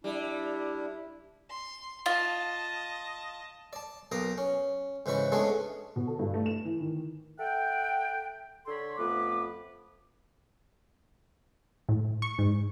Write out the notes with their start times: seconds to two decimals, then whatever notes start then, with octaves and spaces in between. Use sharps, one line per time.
0.04 G3 D4 E4
1.49 C6
2.06 F4 D#5 A5
3.73 D5 A5
4.12 B1 A#3 A#5 D6 D#6
4.38 C#4
5.06 G#2 C#3 E3 B4 C#6
5.32 G#3 A3 B3 C#4 D4 G#4
5.96 B2
6.07 A4
6.19 G2
6.34 A3
6.46 E7
6.65 E3
6.80 D#3
7.40 A4 E5 F#5 G5
8.67 D3 A4 C#5 B5 C6
8.98 F2 A3 B3 B4 D6
11.89 A2
12.22 C#6
12.38 G#2